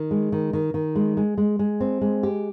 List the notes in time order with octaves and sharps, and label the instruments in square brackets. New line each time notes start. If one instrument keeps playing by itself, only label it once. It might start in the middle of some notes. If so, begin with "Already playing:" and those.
Already playing: [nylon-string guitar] D#3
G#3
D#3
D#3
D#3
G#3
G#3
G#3
G#3
C4
G#3
G4